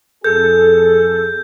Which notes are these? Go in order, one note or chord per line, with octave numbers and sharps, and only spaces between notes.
F2 G#4 A4 G6